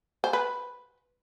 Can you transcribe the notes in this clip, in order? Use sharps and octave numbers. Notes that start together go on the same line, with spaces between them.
C5
B4